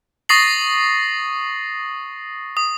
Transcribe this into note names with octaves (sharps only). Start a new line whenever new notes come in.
C#6 D#6 A6 A#6 C7 F#7
D#6